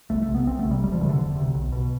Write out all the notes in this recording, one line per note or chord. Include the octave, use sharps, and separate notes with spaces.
C2 A3
A3
C3
B3
C2 C4
A3
C3
G3
E1 G3
F3
D2 E3
C3
D3
E1
D2 C3
B1
B2